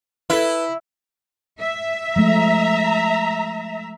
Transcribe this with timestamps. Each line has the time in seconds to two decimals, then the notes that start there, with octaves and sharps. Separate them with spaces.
0.30 E4 A4 B4
1.60 E5
2.16 F3 G#3 A3 A#5